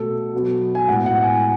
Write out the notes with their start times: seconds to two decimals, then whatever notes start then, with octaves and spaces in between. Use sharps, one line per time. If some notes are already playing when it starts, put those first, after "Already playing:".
Already playing: B2 A3 A4
0.33 B2 F#3 B3
0.75 G#5
0.87 A2 G#3 B3 F#5
1.06 F#5
1.24 G#5